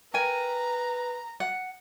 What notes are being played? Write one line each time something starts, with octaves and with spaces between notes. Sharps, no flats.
A#4 B4 G5 G#5 A#5
F#5